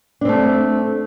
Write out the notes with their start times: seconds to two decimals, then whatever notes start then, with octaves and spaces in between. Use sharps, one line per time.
0.21 D4
0.25 C4
0.29 A3